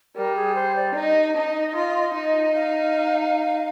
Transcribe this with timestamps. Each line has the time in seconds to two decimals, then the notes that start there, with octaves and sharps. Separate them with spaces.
0.15 G3 A#4
0.36 G#4
0.55 C5
0.76 D5
0.95 D#4 D#5
1.35 D#4
1.75 F4
2.14 D#4
2.54 F5